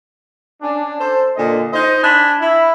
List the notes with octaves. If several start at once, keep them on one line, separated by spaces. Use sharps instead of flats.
C#4 D4
A4 C5
A#2 D3 D#5
D#4 C5 D#5
D4 G#5 B5
E4